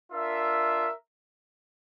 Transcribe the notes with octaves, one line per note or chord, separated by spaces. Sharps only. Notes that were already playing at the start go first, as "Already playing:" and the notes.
D4 F4 A#4 E5